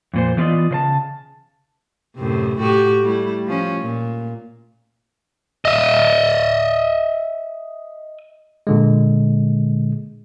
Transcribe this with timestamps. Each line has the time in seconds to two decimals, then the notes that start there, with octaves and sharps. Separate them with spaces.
0.14 F2 A#2 C5
0.37 E3 A3 B3 F4 D5 D#5
0.71 C#3 C5 A5
2.17 F#2 A2 C3
2.58 A2 F#4 G4
3.01 G3 A3 E4
3.46 F3 C#4
3.81 A#2
5.65 D#5 E5
8.67 A#2 D3 G#3